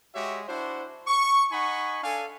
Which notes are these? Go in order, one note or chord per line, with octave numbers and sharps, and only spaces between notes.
G#3 F#4 G4 C#5 E5
D4 E4 F#4 C5
C#6
D#4 F#5 G#5 B5 C#6
D4 A4 F5 G#5